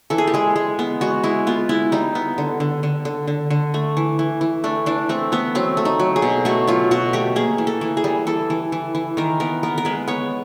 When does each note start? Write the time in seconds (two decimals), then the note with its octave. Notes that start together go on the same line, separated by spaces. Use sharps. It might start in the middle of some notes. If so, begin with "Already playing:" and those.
0.10 E3 A4
0.18 G#4
0.27 G4
0.34 G#3 G#4
0.56 G#3
0.79 B3
1.01 G#3 F#4
1.23 G#3 E4
1.47 B3 F4
1.69 G#3 E4
1.92 G3 D#4
2.15 B3
2.38 D3
2.60 D3
2.83 D3
3.05 D3
3.27 D3
3.50 D3
3.74 A3
3.97 E3
4.19 E3
4.41 E3
4.64 A3 D4
4.86 E3 D4
5.09 A3 C4
5.32 A3 B3
5.55 F#3 C4
5.77 A3
5.85 D#4
5.99 F#3
6.16 G#4
6.22 B2
6.45 A3 F#4
6.67 F#3 F4
6.91 B2 F#4
7.13 A3 G4
7.36 A#3 G#4
7.58 E3
7.67 A4
7.81 E3
7.97 G#4
8.04 G3
8.27 E3 A4
8.50 E3
8.72 E3
8.95 E3
9.17 D#3 A#4
9.40 B3 A#4
9.63 B3 A#4
9.78 A#4
9.85 G#3 B4
10.07 B3 C#5